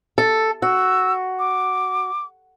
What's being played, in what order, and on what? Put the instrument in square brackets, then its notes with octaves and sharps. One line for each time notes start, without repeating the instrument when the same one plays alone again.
[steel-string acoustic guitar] A4
[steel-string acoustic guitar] F#4 [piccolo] E6
[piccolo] D6